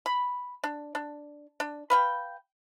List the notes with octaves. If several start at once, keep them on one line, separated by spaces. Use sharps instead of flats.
B5
D4
D4
D4
B4 F5 G5